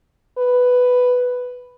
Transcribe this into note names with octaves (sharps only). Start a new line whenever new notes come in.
B4